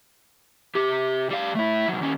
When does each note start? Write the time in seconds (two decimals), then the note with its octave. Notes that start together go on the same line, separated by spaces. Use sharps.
0.75 C3 G4
1.30 G3 F5
1.55 A3 E4
1.88 C3 F#3
2.01 D#2 C#4